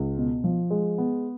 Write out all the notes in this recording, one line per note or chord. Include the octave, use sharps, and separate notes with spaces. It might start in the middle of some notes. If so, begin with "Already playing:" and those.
Already playing: C#2
B2
F3
G#3
B3